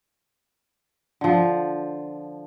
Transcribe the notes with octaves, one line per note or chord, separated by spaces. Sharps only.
D3 F3